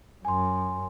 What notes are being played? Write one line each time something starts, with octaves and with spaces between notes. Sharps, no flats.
F#2 G#5 C6